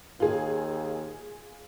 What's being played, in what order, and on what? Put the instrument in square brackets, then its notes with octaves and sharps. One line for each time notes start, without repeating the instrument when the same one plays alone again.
[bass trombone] D#2 [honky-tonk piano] F4 G#4